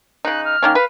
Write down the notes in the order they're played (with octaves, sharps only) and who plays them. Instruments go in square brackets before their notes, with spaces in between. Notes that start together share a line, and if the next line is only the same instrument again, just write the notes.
[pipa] C#3 D#4 [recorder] F#6
[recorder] F6
[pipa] D#3 A#3 C#4
[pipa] B4 [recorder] F5